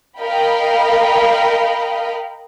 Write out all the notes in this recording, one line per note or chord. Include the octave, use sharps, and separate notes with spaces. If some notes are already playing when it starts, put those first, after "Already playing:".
A#4 D#5 F5 G5 B5